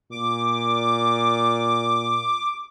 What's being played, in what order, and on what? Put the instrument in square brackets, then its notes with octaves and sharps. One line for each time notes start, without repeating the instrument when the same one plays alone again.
[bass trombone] A#2 [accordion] D6